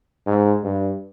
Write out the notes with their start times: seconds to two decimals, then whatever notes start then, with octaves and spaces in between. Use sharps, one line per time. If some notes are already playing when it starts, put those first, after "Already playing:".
0.26 G#2
0.63 G2